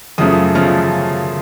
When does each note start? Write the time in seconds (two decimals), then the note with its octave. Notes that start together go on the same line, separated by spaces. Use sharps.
0.18 F#2 C#3 F3 A3 D#6
0.55 C#3 F3 A3 F6